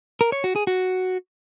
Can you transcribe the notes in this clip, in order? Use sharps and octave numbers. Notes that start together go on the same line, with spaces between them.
A#4
C#5
F#4
G#4
F#4